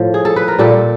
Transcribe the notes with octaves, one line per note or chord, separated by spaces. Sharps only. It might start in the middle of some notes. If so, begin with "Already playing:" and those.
Already playing: A2 F3
G#4
A4
B4
A#4
A#2 G3 A4